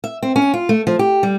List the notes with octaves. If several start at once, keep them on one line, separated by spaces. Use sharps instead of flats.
E5
C4
C#4
F4
A3
F3
G4
G3